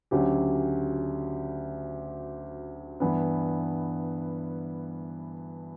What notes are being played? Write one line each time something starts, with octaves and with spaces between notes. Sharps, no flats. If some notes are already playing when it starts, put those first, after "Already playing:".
D2 C#3 F#3 C#4 G4
G2 E3 B3